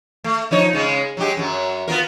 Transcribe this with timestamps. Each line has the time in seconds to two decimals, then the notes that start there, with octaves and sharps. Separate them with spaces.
0.24 A3
0.51 F3 D#4 C#5
0.73 C#3 G#3 C#4
1.17 F#3 G#3 G4
1.37 F#2 F#3
1.88 B3 F4 A#4